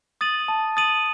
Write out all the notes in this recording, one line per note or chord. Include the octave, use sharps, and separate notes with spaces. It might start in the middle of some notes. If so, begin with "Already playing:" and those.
D#6 A6 D#7 F#7
A5
D#6 A6 D#7 F#7